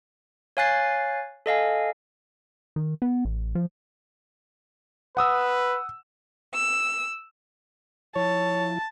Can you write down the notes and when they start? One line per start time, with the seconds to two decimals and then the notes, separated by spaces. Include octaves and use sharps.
0.57 C#5 F5 G#5 F#6 A6 C7
1.46 A4 D#5 F5 G#5
2.76 D#3
3.02 B3
3.25 A1
3.55 F3
5.17 B4 F#5 D#6 E6
6.55 E6
8.16 F3 E4 C#5 A5